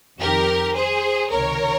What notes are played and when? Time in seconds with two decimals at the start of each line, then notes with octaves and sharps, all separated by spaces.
0.20 F2 D#3 G4 A#4
0.74 G#4 C5
1.30 C#2 C3 D#3 A#4 C#5